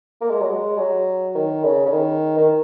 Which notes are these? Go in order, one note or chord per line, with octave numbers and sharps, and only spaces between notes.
A#3
G#3
F#3
G#3
F#3
D#3
C#3
C#3
D#3
D#3